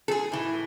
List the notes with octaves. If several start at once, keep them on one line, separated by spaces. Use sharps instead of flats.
A4
G#4
A2 E3